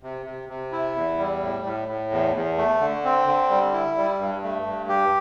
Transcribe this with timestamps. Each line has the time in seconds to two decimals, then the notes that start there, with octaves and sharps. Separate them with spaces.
0.03 C3
0.26 C3
0.49 C3
0.72 E4
0.96 E2
1.18 G3
1.42 A2
1.65 A2
1.88 A2
2.11 E2
2.35 E2
2.58 A3
2.80 D3
3.05 C4
3.27 D3
3.50 G3
3.73 E4
3.97 G3
4.19 G2
4.44 A3
4.66 G2
4.89 G4